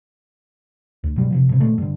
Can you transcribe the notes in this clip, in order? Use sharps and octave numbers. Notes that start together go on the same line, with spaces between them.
D2
G2 B2 F#3 G3
C3 D#3 F3
G2 C3
A#2 D#3 G#3 A3
G2 D3